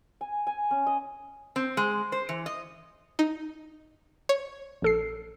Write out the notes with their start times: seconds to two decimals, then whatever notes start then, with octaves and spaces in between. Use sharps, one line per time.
0.21 G#5
0.47 G#5
0.71 C#4
0.87 D#5
1.56 C4
1.77 G#3
2.12 C5
2.29 E3
2.46 D#5
3.19 D#4
4.29 C#5
4.82 A#1 A4 C7